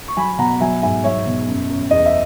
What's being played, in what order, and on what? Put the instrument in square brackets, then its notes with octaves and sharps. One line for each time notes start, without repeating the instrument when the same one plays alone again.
[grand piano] C#6
F#3 G#5 B5
B2 F#5 A#5
F#3 E5 G#5
G#2 E5 G#5
F#3 C#5 E5
B2
F#2
F#2
E2 D#5
E5